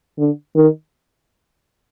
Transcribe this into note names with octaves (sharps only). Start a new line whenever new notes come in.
D3
D#3